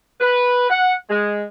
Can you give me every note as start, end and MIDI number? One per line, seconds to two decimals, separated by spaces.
0.20 0.67 71
0.70 0.95 78
1.10 1.45 56